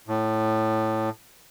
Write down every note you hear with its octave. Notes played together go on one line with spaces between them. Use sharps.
A2